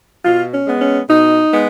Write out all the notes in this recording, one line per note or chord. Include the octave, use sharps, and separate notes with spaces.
B2 F4
C#4
G#3 B3
C#4
B2 D#4
G#3 B3